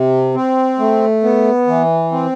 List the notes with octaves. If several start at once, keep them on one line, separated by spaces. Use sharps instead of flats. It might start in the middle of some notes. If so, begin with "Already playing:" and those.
Already playing: C3
C4
A3
B3
E3
C4